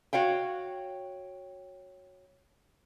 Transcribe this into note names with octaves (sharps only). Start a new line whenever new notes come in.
F#4 C#5 F5 G5